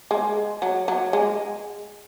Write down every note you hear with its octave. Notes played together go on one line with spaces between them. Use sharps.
G#3
F#3
F#3
G#3